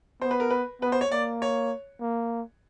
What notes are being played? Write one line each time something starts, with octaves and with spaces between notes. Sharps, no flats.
B3 C5
B4
A#4
B4
B3 B4
C5
C#5
A#3 D5
C#5
A#3